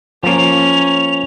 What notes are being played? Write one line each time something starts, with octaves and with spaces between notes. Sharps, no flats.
F3 A#3 C#4 F7